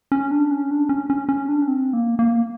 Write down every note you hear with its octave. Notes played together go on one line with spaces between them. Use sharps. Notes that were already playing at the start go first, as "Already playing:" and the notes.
C#4
D4
C#4
D4
C#4
C#4
C#4
D4
C#4
C4
A#3
A#3